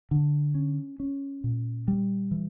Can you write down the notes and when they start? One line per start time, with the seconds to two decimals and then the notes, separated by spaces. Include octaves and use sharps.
0.11 D3
0.55 C#4
1.00 C#4
1.44 A#2
1.88 G3
2.31 E3